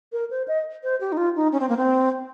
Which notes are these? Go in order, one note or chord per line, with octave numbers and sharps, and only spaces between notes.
A#4
C5
D#5
C5
G4
D#4
F4
D#4
C#4
C4
A#3
C4